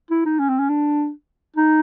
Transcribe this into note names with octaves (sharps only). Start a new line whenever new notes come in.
E4
D#4
C#4
C4
C#4
D4
D#4